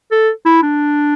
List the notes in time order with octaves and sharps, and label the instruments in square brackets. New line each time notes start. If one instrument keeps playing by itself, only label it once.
[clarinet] A4
E4
D4